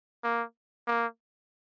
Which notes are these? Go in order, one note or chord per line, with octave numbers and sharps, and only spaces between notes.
A#3
A#3